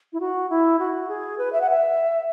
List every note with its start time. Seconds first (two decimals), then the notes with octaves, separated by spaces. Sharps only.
0.13 E4
0.20 F#4
0.50 E4
0.79 F#4
1.09 G#4
1.38 B4
1.53 E5
1.61 F#5
1.70 E5